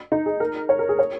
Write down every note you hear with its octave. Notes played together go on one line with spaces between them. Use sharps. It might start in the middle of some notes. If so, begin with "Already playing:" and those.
D#4
G#4
A#4
C#5
A#4
G#4
C#5